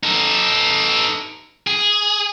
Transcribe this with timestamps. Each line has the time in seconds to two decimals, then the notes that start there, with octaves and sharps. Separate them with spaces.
0.03 D#4 A4
1.67 G#4